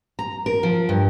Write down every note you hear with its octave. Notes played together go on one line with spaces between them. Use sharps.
A#5
A#4
F3
G2